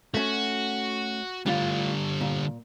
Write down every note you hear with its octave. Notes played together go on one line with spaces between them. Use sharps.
A3 C#4 F#4
A2 D3 G3 D4 F4
A#2